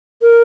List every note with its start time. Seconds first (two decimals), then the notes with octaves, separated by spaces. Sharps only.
0.22 A#4